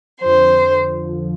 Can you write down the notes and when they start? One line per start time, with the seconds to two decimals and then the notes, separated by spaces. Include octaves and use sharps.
0.21 F2 D3 F3 C5